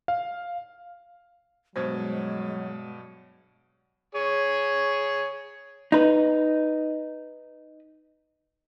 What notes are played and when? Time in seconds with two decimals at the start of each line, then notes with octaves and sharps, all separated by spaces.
0.08 F5
1.76 G2 B2 F#3 G#3 C5 G#6
4.15 G#4 C#5
5.92 D#4 B4